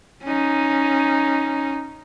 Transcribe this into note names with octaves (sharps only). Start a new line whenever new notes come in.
C#4 D#4